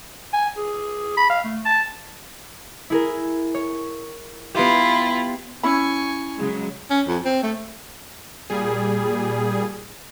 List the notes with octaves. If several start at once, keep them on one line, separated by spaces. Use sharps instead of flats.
G#5
G#4
B5
F5
A3
A5
E4 G#4 A#4
C#5
B3 E4 F4 G4
C#4 E4 G#5 B5 C#6
C#3 F#3 G#3
C#4
F2
C4
A3
A#2 G3 G#4